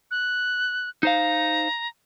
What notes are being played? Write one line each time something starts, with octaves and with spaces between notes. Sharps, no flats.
F#6
D#4 C5 F5 A#5